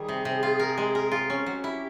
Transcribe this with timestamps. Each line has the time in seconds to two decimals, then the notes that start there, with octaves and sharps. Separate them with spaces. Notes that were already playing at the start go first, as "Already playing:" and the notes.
Already playing: D#3 G3 G#4
0.08 C3
0.25 C3
0.43 F4
0.59 A#4
0.78 G#3
0.95 A#4
1.11 F4
1.30 C#4
1.46 F#3 G4
1.64 E4